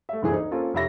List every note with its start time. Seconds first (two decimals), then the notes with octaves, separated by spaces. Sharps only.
0.09 A3 E5
0.22 F#1 D2 G2 E3 C4 G#4
0.34 D#4
0.51 A#3 C4 C#4 F4 A4 A#4
0.74 F1 G4 C#5 E5 B5 A#6